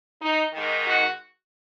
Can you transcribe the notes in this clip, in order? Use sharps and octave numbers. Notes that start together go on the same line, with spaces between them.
D#4
G#2 D#3
F#4